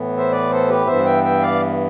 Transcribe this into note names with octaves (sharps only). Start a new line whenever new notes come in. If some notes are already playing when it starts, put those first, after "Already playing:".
Already playing: A2 E3 B3
C5 E5
B4 D5
A4 C5
G4 B4
G2 E3 B3 C5 E5
E5 G5
E5 G5
D5 F5